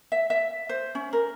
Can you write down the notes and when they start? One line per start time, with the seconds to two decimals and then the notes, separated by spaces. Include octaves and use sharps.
0.12 E5
0.30 E5
0.69 C5
0.95 C#4
1.13 A#4